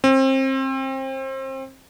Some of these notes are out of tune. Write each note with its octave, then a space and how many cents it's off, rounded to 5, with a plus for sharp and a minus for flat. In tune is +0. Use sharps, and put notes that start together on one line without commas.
C4 +30